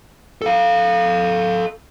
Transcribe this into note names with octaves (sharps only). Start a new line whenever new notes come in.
A4 F5